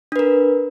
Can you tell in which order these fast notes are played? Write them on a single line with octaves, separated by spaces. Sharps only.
D4 B4 A#4